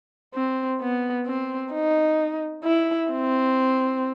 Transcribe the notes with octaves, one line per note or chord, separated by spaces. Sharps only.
C4
B3
C4
D#4
E4
C4